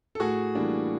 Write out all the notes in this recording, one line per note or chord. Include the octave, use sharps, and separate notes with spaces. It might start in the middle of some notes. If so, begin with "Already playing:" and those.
A4
A2 F#4 G#4
E3 G3 A#3 D4